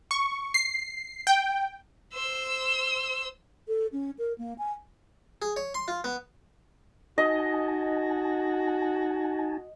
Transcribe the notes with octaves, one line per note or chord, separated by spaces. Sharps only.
C#6
C7
G5
C5 E6
A4
C#4
A#4
A#3
G#5
G#4
C#5
C6
F4
B3
D#4 F#4 D#5 G#5 A5